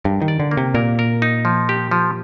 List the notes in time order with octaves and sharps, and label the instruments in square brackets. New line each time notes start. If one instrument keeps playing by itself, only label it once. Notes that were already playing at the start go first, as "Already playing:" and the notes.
[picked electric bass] G2 [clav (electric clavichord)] A#4
[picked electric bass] D#3
[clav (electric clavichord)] D5
[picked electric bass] D3
[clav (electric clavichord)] A#3
[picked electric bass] C3
[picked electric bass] A#2 [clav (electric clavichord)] A#4
[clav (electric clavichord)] A#4
D#4
F3
G4
F3